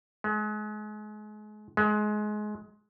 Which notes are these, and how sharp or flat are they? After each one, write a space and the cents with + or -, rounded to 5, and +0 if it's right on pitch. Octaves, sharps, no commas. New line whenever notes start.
G#3 +35
G#3 +25